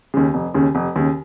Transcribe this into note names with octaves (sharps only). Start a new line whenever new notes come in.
D#2 C#3
F1
D#2 C#3
F1
D#2 C#3